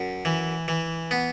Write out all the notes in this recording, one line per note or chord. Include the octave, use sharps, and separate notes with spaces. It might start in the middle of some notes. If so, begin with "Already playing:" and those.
Already playing: F#2
E3
E3
B3